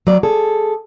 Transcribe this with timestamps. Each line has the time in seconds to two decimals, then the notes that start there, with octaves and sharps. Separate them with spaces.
0.07 F#3 D5
0.23 G#4 A4